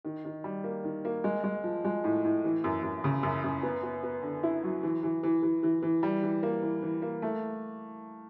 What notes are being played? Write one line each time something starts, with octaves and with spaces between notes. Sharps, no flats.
D#3
D#3
G3
A#3
D#3
A#3
G#3
G#3
F3
G#3
A2
A2
E3
F#2
F#2
C#3
F#2
F#2
B3
B3
B3
D3
E4
F#3
E3
E3
E3
E3
E3
E3
G3
E3
A#3
E3
E3
A#3
A3